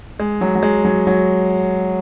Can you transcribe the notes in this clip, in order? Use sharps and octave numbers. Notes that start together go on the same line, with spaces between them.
G#3
F#3
F#3
G#3
F#3
F#3